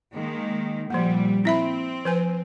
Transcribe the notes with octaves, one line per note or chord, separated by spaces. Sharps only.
D#3 G#3 A#3
A#2 F3 G3 A#3
C4 E4 E5 B5
F3 B4 G#5